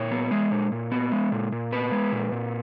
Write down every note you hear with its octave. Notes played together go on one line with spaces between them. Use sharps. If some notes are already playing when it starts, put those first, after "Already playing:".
Already playing: A#2 C#5
B3
G#3
A#2
A#2
B3
G#3
A#2
A#2
B3 B4
G#3
A#2
A#2